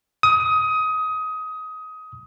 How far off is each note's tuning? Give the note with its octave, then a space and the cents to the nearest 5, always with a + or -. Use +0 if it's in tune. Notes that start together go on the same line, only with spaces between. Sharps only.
D#6 +20